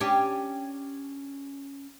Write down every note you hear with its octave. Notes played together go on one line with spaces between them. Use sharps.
C#4 D4 G4